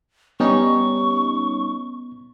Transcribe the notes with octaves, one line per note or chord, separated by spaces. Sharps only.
G3 B3 C#4 D#4 C#6